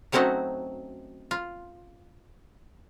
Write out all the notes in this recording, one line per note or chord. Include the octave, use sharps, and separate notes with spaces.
F#3 A3 C4 C#4 D#4 F#4
F4